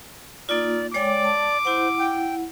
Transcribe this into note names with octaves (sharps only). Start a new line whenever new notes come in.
A#3 D#4 F4 D5
G#3 C#5 D5 G5 D6
A5
E4 C5 F#5
G5